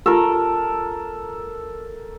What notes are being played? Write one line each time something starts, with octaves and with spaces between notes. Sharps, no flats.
F4 G4 A4 A#4